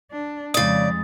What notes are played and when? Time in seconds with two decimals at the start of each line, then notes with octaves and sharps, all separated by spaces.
0.12 D4
0.54 F2 C#3 G#3 D5 D#6 A6